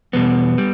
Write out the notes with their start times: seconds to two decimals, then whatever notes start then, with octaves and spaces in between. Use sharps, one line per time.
0.13 E2 B2 G3 B3
0.58 G3